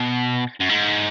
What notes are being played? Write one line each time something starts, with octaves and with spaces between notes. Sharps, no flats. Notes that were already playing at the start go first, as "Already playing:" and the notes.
Already playing: B2
F#2
G#2